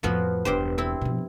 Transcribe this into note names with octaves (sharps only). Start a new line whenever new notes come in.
F2 A2 F3 B3 F#4
E1 G2 G4 C5
C4 E4
B2 F3